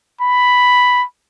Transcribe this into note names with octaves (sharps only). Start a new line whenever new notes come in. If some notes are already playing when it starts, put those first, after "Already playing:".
B5